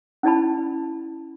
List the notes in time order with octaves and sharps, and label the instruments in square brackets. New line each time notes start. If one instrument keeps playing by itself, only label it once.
[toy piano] C#4 E4 D5 A5 B5